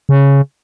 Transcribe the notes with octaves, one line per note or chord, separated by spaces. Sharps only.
C#3